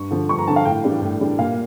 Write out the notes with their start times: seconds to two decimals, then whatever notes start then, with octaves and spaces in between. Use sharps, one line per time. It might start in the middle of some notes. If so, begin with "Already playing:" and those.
Already playing: G2 C#6
0.11 D3 F3
0.29 G2 C#6
0.38 A#5
0.47 D3 F3 A5
0.56 F5
0.65 A2 G5
0.84 E3 G3 D4
1.02 A2
1.20 E3 G3 D4
1.39 A#2 F5